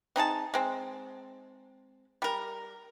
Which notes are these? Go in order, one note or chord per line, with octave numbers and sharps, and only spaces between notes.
C4 D#4 G#4 A5
G#3 C4
G3 A#4